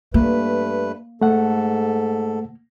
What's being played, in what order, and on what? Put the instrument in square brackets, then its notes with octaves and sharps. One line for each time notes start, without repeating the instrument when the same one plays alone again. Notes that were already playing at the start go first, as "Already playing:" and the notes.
[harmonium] G2 A3 B4 [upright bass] A#3
[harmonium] G#2 A4 [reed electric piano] A3 F#5